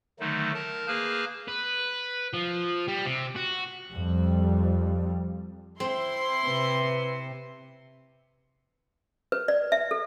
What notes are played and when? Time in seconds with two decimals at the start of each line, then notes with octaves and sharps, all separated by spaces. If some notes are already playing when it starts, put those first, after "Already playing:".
0.20 D3 D#3 F#3 A3 D#4
0.54 A#4 A5
0.87 A#3 G#4 B4 A5 F6 G6
1.48 B4
2.34 F3
2.88 G3
3.06 C3
3.36 F#4
3.92 F2 G3
5.80 C4 E4 C6
6.47 C3 B4
9.32 B4
9.48 D5
9.72 E5
9.91 A4